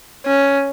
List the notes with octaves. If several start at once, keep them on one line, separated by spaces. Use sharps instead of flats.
C#4